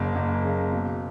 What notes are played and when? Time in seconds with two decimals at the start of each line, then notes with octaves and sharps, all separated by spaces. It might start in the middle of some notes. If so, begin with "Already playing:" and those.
Already playing: F#1 C#3 A#3
0.15 F#1
0.45 C#3
0.72 B2